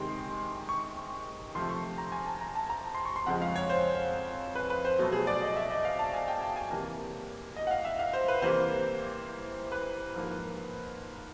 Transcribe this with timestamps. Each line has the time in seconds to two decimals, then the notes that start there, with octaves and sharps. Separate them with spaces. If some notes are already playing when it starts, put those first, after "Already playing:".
Already playing: C3 D#3 G#3 C6
0.69 C#6
1.55 C3 F3 A3 C6
1.70 C#6
1.98 A#5
2.12 G#5
2.26 A5
2.41 A#5
2.55 A5
2.70 A#5
2.95 C6
3.05 C#6
3.16 C6
3.26 F2 C#3 F3 G#3 F#5
3.42 F5
3.56 C#5
3.70 C5
4.55 B4
4.70 B4
4.85 C5
4.99 B2 F#3 A3
5.12 G#4
5.27 D5
5.42 D#5
5.56 E5
5.70 D#5
5.85 F5
5.99 A5
6.14 G#5
6.28 G5
6.42 A5
6.56 G#5
6.70 C3 E3 G3 A#3
7.56 D#5
7.67 F#5
7.71 F5
7.85 E5
7.99 F5
8.13 C5
8.28 B4
8.42 C3 E3 G3 A#3 C5
9.72 B4
10.15 G#2 F3 A#3